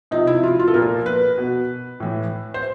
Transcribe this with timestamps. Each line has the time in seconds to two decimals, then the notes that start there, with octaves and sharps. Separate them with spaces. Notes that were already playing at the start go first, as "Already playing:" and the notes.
0.11 C3 F3 D#4
0.27 E4
0.43 F4
0.59 F4
0.68 A4
0.74 A#2 F3 A#4
1.06 B4
1.38 B2
2.00 A2 E3
2.54 C5